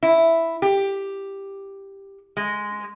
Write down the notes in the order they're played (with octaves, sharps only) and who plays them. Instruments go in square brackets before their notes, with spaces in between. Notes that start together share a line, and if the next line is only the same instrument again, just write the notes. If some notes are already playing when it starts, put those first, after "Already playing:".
[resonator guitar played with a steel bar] E4
G4
G#3